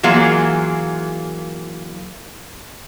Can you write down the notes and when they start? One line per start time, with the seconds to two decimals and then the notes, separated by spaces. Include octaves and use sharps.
0.03 E3 F#3 A#3 F4 G#4